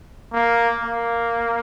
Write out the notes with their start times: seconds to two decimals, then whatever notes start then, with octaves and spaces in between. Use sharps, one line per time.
0.33 A#3
0.83 A#3